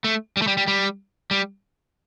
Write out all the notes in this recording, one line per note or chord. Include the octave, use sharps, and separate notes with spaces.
A3
G3
A3
G3
G3
G3
G3